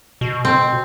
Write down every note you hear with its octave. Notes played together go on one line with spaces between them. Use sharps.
B2
C4